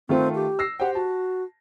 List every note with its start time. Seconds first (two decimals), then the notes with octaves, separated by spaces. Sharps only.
0.09 D#3 A3 C4 F4
0.35 G4
0.59 E6 A#6 C7
0.80 G4 C5 F#5 G5
0.95 F#4 A5